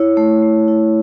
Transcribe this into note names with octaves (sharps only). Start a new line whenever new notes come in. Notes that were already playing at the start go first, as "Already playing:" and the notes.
Already playing: E4 C#5
A3
A3
E4